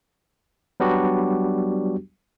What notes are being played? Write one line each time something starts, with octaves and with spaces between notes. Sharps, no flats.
F#3 G3 B3 D4 F#4 G4